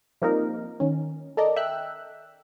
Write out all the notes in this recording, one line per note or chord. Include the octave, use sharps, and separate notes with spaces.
F3 G3 A#3 C4 D#4 A#4
D#3 C#4
A4 A#4 D5 D#5
E5 G5 E6 F#6